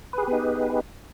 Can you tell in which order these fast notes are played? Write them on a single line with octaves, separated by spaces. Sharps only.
B4 G#4 G4 B3 D#4